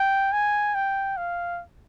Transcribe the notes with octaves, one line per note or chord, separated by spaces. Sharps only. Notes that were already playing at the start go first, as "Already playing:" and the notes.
Already playing: G5
G#5
G5
F5